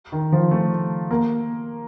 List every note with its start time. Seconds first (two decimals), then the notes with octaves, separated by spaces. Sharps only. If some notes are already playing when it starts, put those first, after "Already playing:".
0.12 D#3
0.32 F3
0.51 A3
1.11 A#3